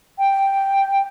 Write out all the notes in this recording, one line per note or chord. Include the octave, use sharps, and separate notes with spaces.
G5